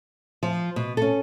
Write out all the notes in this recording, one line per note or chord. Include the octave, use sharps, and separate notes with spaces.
F3
B2
C#4 A4